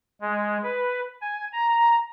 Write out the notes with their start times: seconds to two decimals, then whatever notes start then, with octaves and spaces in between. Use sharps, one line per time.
0.21 G#3
0.63 B4
1.21 G#5
1.53 A#5